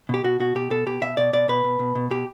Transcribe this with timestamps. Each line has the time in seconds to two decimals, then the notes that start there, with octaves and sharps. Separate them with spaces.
0.09 B2 G4
0.24 B2 F#4
0.40 B2 F#4
0.55 B2 G4
0.70 B2 A4
0.86 B2 G4
1.02 B2 E5
1.17 B2 D5
1.33 B2 D5
1.48 B2 B4
1.64 B2
1.79 B2
1.95 B2
2.11 B2 G4